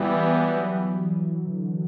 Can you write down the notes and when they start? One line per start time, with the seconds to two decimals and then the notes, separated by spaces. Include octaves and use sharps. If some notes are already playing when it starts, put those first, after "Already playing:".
Already playing: E3 G3 B3
0.39 F#3
0.85 E3
1.16 E3
1.46 D3